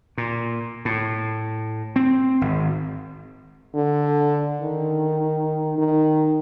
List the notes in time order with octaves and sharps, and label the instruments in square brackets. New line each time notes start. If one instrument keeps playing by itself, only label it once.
[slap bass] A#2
A2
C4
G#1
[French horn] D3
D#3
D#3